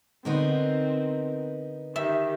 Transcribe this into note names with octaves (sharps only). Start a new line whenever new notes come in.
D3 B3 C4 D#4 F#4 A#4 C6
D#3 G4 E5